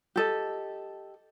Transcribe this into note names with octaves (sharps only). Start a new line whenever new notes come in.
G4 A4 D#5